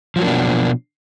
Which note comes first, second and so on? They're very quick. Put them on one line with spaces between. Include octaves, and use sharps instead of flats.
F3 F#3 A#3 D4 B2